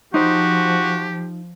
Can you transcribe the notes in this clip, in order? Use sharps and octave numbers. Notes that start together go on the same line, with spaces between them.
F3 D#4 F#4 G4 C5